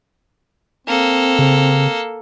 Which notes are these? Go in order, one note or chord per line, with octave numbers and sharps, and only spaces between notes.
A#3 C4 A4
C#3